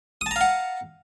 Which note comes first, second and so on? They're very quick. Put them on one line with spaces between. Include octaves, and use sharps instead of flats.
D#6 A5 A#5 F5 F#5